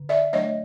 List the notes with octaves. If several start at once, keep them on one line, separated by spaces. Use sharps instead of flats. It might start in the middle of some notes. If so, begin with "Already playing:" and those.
Already playing: D3
D5 E5
F#3 A3 D4 C#5 D#5